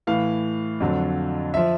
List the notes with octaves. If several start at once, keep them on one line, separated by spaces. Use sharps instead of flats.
A2 E3 F5
F2 D3 F#3
F3 E5